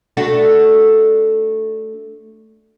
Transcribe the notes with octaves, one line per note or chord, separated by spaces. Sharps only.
A3 D4 F#4